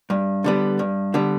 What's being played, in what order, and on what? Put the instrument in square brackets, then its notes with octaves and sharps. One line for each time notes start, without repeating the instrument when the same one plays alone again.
[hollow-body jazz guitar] G2
D3 G3 B3
G2
D3 G3 B3